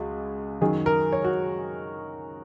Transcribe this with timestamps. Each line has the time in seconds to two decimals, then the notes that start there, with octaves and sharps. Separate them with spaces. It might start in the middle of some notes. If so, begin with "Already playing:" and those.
Already playing: C#2 C#3 G#3 F#4
0.61 F#2 D#3 F#3 G#4
0.86 A#4
1.12 C#5
1.24 F#4